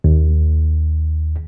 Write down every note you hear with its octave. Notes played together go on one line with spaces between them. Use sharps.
D#2